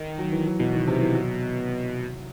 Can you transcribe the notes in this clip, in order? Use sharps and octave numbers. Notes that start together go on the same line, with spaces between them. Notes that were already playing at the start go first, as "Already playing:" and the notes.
Already playing: D#3
F#3
E3
F#3
B2 E3
D#3
C3
E3
F#3